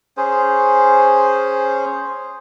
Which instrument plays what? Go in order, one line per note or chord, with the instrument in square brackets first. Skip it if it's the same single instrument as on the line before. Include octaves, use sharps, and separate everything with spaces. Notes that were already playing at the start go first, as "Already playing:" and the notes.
[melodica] C#4 G#4 C5